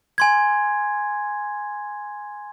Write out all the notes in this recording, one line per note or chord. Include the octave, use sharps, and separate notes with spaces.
G#5 C6 G#6